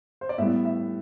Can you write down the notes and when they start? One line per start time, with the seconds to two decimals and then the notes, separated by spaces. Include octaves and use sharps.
0.21 C5
0.29 D5
0.38 A2 G3 B3 E5
0.65 E5